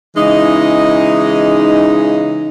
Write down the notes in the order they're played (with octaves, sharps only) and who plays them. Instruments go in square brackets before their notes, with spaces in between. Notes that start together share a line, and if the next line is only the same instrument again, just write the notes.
[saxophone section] C#3 E3 G#3 D#4